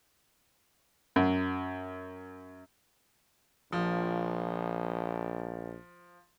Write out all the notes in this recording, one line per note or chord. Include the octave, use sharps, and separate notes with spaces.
F#2
A#1 F3